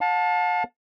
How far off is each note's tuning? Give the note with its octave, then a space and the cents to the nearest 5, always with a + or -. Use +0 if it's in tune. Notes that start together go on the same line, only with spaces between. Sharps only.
F5 +45 A5 +0